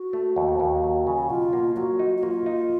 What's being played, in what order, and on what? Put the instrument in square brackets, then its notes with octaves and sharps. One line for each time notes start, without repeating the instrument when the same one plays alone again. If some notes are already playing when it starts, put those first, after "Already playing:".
Already playing: [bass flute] F#4
[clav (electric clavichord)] A3
D#2
D#2
F#3
C#3
[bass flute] F#4
[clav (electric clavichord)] B2 [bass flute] F4
[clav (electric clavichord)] A#3
[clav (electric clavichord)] F#3 [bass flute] F#4
[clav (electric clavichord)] D#4
[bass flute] F#4
[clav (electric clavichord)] A#3 [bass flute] F4
[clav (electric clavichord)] D#4